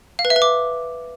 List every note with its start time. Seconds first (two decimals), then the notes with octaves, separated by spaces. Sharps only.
0.19 F5
0.25 B4
0.30 E5
0.36 B4
0.42 D6